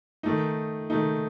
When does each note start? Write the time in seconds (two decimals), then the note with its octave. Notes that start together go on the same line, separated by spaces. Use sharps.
0.23 D#3 A3 D#4
0.90 D#3 A3 D#4